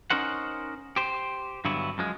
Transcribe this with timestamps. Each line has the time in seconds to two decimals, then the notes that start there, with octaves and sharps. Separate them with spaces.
0.10 C#4 D#4 A#4 C5 F#5
0.96 G4 C5
1.65 G2 D3 F#3 B3 E4
1.98 F#2 F3 G#3